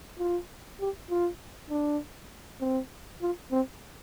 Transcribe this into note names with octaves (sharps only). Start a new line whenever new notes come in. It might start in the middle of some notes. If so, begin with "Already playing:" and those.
F4
G4
F4
D4
C4
F4
C4